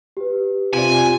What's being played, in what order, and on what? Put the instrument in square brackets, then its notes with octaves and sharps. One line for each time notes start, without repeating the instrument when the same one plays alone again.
[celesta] G4 B4
[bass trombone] C3 [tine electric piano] F4 D5 [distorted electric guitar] G#5